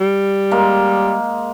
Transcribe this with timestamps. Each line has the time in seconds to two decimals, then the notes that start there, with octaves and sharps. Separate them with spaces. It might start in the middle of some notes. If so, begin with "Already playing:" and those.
0.01 G3
0.51 G#3 A#3